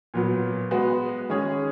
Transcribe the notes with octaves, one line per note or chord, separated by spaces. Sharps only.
A#2 F#3 B3
G#3 B3 F#4 B4
D#3 G#3 C#4 G#4 C#5